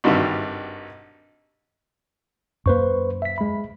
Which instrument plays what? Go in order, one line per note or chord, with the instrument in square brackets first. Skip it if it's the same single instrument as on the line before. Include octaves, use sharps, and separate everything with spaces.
[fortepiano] G#1 G2 G3 D#4 F#4 E5
[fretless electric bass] F#2 A#3 [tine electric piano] B4 C5 C#6
[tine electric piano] E5 B6
G#3 B5